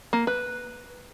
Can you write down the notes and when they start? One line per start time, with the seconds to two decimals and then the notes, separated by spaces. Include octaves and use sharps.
0.13 A#3
0.27 B4